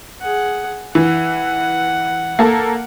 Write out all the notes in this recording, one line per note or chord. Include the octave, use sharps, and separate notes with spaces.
G#4 F#5
E3 F#5
A#3 A4